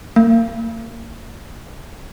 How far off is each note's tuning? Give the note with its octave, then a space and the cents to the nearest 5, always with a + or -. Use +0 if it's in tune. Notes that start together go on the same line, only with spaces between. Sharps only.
A#3 -30